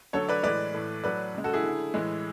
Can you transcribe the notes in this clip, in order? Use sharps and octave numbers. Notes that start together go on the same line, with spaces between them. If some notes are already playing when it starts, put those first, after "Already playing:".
D3 F#3 A3 A4 C#5
B4 D5
A2 E3 G#3 B4 D5
A2 E3 A3
A2 F#3 A3 B4 D5
C#3 G#3
F#4 A4
E4 G#4
D3 A3
A2 E3 G#3